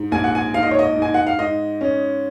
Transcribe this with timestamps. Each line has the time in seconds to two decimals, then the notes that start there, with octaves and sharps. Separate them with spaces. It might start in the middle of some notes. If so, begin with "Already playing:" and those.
Already playing: G#2
0.12 A#1 G#5
0.24 F#5
0.35 G#5
0.54 G#2 F5
0.63 D#5
0.71 C#5
0.79 D#5
0.96 G#2
1.02 G#5
1.14 F#5
1.27 F5
1.39 G#2 D#5
1.81 C#4